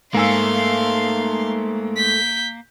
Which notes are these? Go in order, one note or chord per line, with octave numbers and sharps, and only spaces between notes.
G#2 A3 A#3 F5 G#5 C6 E6
G6 B6